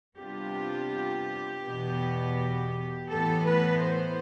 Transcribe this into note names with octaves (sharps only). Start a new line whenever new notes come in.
C3 G3 B3 D4 F4 G4
E2 B2 B3
A2 E3 B3 A4
B4
C5